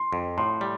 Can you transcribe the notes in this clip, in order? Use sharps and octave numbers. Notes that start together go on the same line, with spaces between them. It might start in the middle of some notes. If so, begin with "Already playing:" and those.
Already playing: C6
F2
A2 C6
G3